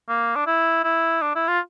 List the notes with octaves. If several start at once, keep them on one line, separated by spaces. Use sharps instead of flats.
A#3
D4
E4
E4
D4
E4
F4